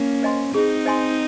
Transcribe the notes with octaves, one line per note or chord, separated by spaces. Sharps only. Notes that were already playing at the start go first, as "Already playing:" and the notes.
Already playing: A#3 C#4
C5 D#5 G#5 C6
C4 D#4 G#4
C5 D#5 G#5 C6